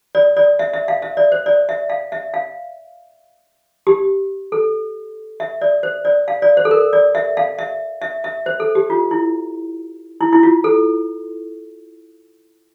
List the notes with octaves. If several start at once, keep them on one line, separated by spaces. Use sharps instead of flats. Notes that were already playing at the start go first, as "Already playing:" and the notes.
D5
D5
E5
E5
F5
E5
D5
C5
D5
E5
F5
E5
F5
G4
A4
E5
D5
C5
D5
F5
D5
C5
A4
A#4
D5
E5
F5
E5
E5
E5
C5
A4
G4
F4
E4
E4
E4
F4
A4